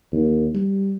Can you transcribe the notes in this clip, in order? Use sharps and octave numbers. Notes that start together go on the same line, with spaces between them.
D#2
G3